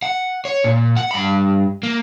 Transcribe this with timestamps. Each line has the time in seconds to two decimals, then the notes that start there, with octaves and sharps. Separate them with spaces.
0.02 F#5
0.45 C#5
0.64 A#2
0.97 F#5
1.11 G2 B5
1.83 A#3